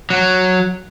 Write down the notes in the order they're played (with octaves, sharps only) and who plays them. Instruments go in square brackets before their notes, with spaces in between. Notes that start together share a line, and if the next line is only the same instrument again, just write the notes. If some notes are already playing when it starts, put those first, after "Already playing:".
[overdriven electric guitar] F#3